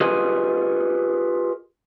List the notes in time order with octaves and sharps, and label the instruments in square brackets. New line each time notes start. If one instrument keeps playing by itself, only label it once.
[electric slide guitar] F4 G4 G#4 A#4 B4 D#5